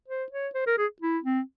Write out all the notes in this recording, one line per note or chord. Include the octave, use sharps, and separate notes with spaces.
C5
C#5
C5
A#4
G#4
E4
C4